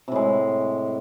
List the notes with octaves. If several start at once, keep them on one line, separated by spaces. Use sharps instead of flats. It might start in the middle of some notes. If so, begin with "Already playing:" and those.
A2 C3 G#3